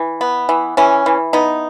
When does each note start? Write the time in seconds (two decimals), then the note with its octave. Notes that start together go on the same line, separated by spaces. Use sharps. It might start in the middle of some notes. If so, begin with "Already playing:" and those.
Already playing: E3
0.21 B3
0.49 E3
0.77 E3 C#4
1.06 E3
1.33 B3 D#4